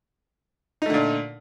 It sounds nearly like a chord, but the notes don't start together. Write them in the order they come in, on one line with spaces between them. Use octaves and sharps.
D#4 A3 D3 A#2